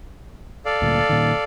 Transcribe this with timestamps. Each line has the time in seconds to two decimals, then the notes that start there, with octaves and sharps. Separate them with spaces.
0.65 A4 D5 F5
0.82 D2 A#2
1.09 A#2 D#3